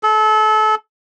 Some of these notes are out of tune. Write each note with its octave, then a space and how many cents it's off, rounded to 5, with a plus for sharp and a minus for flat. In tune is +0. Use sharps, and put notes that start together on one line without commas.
A4 -30